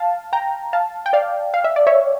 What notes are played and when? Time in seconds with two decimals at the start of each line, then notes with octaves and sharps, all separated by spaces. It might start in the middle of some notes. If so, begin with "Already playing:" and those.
Already playing: F5 A5
0.33 G5 A#5
0.73 F5 A5
1.06 G5
1.13 D5 F5
1.54 F5
1.64 E5
1.76 D5
1.87 C#5 E5